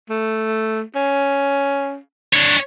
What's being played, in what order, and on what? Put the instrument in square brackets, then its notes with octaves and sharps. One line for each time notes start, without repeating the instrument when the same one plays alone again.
[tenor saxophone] A3
C#4
[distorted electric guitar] D4 C#5